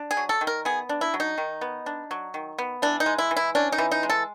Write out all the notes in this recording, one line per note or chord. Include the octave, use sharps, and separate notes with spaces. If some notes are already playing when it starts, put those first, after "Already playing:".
Already playing: D4
G#4
F#3
A4
D#3
A#4
B3 G#4
D4
E4
F#3
D#4
D#3
B3
D4
F#3
D#3
B3
E3 D4
D#4
G#3
E4
E3
E4
C#4 D4
D#4
E3
D#4
G#3
A4